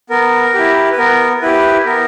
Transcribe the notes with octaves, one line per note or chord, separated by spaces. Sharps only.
B3 A#4
E4 G4
B4
B3 A#4
E4 G4 B4
B3 A#4